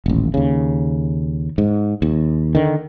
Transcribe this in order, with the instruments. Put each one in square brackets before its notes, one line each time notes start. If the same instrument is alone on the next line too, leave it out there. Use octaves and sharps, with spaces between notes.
[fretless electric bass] D#1 A1
D#2 C#3
G#2
D#2
D3 D#3